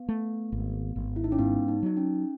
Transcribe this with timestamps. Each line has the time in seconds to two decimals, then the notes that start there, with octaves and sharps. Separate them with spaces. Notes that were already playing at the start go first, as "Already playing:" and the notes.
Already playing: B3
0.09 A3
0.52 G#1
0.96 G#1
1.16 E4
1.24 D#4
1.32 C#4
1.39 G#2 B3
1.68 D#4
1.83 F#3 D#4
1.97 C#4